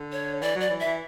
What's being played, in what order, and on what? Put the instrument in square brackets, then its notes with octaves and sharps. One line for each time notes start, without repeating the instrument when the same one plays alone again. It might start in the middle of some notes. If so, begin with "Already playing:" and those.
Already playing: [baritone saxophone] D3
[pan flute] C#5
[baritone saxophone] E3 [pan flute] D5
[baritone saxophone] F#3 [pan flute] D5
[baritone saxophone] E3
[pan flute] E5
[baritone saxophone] E3